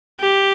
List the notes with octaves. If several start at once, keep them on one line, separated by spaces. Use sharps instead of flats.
G4